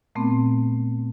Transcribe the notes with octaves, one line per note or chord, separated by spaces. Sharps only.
A#2 A3 B3 C4